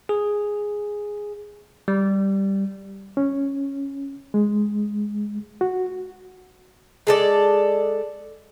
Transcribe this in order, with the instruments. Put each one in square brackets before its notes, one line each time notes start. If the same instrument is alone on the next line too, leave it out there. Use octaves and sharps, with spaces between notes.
[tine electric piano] G#4
G3
[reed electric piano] C#4
G#3
F#4
[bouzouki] G#3 A4 D5